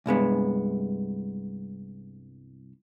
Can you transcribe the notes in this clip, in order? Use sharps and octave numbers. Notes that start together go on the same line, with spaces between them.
C2 G2 G#3 B3